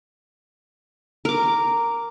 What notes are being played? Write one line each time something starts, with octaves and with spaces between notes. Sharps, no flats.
A#4 D6